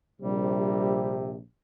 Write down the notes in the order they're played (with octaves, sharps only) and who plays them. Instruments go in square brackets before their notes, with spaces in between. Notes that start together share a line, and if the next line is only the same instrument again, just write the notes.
[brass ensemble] A#1 C3 [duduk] G3